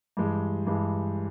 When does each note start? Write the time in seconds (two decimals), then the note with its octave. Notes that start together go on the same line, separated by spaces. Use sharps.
0.17 G2 E3 G#3
0.67 G2 E3 G#3